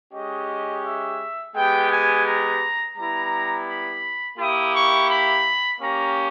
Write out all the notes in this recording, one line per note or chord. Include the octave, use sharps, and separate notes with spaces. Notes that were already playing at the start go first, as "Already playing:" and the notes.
G#3 C#4 G4 D#5
E5
G#3 B3 G4 G5
G#5
A#5
G3 B3 E4 A#5
B5
A#3 E4 G4 D#6
C#6
B5
A#3 C#4 G4 A#5